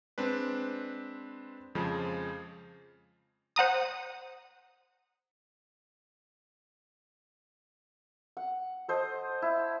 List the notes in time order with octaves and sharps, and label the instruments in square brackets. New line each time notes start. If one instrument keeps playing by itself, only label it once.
[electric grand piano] G#3 C4 D4 B4
F2 C#3 F3 G#3
[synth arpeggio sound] C5 F#5 A#5 D#6
[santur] F#5
A4 C5 D#5
E4